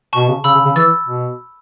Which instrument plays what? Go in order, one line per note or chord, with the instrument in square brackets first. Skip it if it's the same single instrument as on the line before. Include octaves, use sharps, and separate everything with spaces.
[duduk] B2 [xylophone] A5 C#6
[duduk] C#3
[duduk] C#3 [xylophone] B5 E6
[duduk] C#3
C#3
[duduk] E3 [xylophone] E6 A6
[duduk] B2